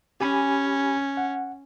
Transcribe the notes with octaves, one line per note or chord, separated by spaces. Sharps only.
C#4 G4 G#5 B5
F#5